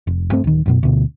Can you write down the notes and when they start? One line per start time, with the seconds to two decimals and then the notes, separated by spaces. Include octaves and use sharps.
0.07 F1
0.32 G2 A3 C4
0.44 D1 D#3
0.66 A1 F#2 B2
0.83 D2 B2